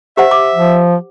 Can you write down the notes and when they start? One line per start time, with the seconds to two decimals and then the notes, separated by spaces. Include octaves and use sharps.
0.17 G4 C5 E5 F#5
0.31 D6
0.54 F3